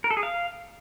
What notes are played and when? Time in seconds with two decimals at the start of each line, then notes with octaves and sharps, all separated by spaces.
0.04 A#4
0.10 A4
0.17 G#4
0.23 F5